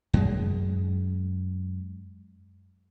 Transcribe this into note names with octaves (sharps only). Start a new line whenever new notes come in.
F#2 G#3